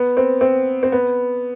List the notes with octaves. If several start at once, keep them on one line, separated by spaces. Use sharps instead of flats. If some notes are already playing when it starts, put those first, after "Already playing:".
Already playing: B3
C4
C4
C4
B3